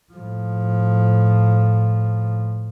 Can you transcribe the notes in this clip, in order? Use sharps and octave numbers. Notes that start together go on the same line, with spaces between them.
A2 F3